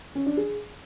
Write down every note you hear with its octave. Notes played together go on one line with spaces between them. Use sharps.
C#4
D4
G#4